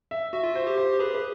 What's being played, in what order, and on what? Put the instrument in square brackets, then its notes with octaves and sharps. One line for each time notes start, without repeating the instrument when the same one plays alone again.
[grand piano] E5
[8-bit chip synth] F#4 [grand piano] E5
[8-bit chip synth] F4
[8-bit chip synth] F#4 [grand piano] C5
[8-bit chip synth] G4
[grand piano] C5
[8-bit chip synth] G#4 [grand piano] B4
[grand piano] B4